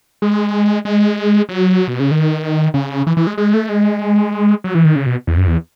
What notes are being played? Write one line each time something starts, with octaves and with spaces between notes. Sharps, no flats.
G#3
G#3
F#3
B2
C#3
D#3
C#3
E3
E3
G#3
G#3
A3
G#3
F#3
E3
D#3
C#3
B2
E2
F#2
E2